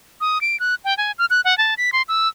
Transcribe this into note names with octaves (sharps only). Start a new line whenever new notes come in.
D#6
D7
F#6
G5
G#5
F6
F#6
F#5
A5
B6
C6
E6